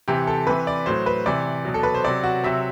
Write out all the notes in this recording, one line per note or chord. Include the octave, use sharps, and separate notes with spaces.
C3 E3 G4
A4
C3 E3 B4
D5
A2 F#3 C5
B4
C3 E3 D5
B2 F#3
A4
B4
C5
C3 F#3 D5
F#4
C3 F#3 E5